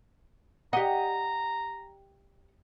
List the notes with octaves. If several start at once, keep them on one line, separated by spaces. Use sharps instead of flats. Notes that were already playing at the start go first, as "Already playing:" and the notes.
G4 D#5 F#5 A#5